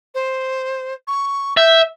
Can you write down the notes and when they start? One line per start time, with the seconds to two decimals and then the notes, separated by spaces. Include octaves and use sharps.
0.14 C5
1.07 C#6
1.57 E5 G6